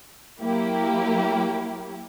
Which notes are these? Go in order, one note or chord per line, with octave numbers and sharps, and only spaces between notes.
F#3 A#3 E4 G4